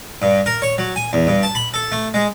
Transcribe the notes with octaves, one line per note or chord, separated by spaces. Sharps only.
G2
A#4
C#5
F#3
G#5
E2
G2
A5
B5
A4
A3
G#3